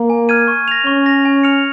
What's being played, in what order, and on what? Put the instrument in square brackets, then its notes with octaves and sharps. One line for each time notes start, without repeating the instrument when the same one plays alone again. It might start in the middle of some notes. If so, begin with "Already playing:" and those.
Already playing: [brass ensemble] A#3
[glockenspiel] G#5
F6 G#6 D#7
C#6
A#6 F7
[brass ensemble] C#4 [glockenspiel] C#6
[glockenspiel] A#6 F7
G#5
F6 C#7 F7